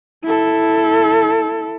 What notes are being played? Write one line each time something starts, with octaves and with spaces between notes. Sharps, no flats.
E4 A4